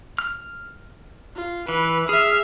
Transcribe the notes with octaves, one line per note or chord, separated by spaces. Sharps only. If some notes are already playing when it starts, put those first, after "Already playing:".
F6
F4
E3 B4
G#4 E5 F6